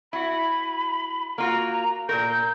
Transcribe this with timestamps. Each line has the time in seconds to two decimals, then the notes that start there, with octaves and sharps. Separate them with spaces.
0.13 E4 F#4 B5
1.38 A#3 F4 F#4 A#5
2.09 A#2 E3 A#4 G6